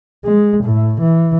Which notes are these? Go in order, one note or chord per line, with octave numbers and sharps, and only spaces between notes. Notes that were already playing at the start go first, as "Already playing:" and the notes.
G#3
A2
E3